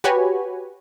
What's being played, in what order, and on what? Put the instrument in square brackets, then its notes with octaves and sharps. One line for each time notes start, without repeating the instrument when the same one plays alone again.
[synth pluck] F#4 G4 B4 C#5 G#5